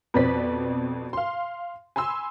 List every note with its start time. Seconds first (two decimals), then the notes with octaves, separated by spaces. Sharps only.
0.14 F2 B2 B4 C5 D5 B6
1.13 F5 C6
1.96 G#5 B5 C6 E6